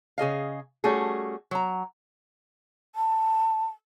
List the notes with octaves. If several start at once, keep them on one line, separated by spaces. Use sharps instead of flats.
C#3 G#4 D#5 F5
G3 A3 C#4 F#4 G#4
F#3 A#5
A5